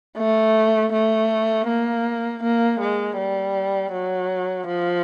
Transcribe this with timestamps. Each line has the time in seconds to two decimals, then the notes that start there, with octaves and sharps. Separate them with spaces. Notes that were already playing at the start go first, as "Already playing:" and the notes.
0.17 A3
0.93 A3
1.68 A#3
2.43 A#3
2.80 G#3
3.17 G3
3.93 F#3
4.68 F3